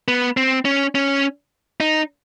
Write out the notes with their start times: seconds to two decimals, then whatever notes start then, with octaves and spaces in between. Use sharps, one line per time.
0.08 B3
0.37 C4
0.65 C#4
0.95 C#4
1.80 D#4